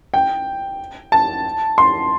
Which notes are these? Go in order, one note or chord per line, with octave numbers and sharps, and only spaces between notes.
G5
A5
C6